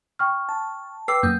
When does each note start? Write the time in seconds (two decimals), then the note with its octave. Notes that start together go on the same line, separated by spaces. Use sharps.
0.19 G5 C#6 F6
0.49 A5
1.08 B4 G5 D6 E6 C7
1.23 F#2 A#3 D#6 G6